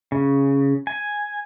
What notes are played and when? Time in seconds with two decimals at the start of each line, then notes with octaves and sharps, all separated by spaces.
0.12 C#3
0.87 G#5